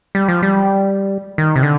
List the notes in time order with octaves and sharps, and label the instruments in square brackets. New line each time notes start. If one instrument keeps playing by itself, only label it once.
[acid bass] G3
F3
G3
D#3
C3
D3